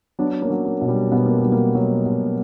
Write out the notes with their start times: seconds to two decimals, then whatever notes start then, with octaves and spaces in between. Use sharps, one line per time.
0.19 F#3 B3 D4
0.42 A#3 C#4
0.50 F#3
0.66 A#3
0.81 B2
0.88 G3
1.12 B2 B3
1.25 A#3
1.39 F#3 G3
1.52 A#3
1.75 F#3
2.06 B2